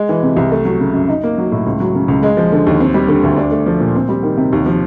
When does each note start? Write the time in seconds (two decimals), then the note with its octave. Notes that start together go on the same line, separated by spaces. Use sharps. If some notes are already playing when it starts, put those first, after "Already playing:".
Already playing: G#3
0.09 E3
0.23 C3
0.36 C2
0.52 A3
0.65 F#3
0.80 C#3
0.94 F#2
1.09 D#4
1.23 A#3
1.38 F#3
1.52 A2
1.66 C#2
1.80 F#3
1.95 C#3
2.08 C#2
2.23 G#3
2.37 F3
2.52 D3
2.66 D#2
2.80 C4
2.94 G3
3.08 D3
3.23 D2
3.37 D4
3.51 A3
3.66 F3
3.81 A#2
3.95 C4
4.09 G3
4.23 D#3
4.37 C3
4.52 D#2
4.66 F3